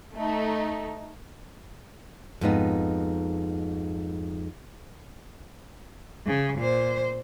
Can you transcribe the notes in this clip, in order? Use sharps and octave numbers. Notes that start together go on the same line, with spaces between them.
A3 D#4
F2 G#2 B3 D#4
C#3
A#2 C5